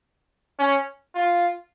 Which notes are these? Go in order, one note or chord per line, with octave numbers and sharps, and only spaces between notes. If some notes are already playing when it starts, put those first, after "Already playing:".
C#4
F4